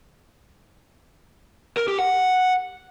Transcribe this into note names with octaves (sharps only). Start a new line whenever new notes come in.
A#4
G4
F#5